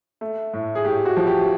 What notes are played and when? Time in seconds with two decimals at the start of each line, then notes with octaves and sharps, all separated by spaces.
0.21 A3
0.53 A2
0.75 G#4
0.85 A2 G4
1.06 F#4
1.16 F3
1.27 G4